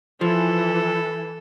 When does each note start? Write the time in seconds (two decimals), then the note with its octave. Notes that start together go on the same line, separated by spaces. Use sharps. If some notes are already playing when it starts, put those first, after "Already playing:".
0.21 E3 F3 A4